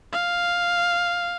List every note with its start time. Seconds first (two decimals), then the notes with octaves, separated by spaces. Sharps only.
0.13 F5